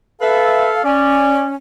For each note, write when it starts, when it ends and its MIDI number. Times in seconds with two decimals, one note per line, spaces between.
0.21 0.83 69
0.21 0.71 71
0.21 0.71 76
0.21 0.83 77
0.84 1.55 61
0.84 1.45 74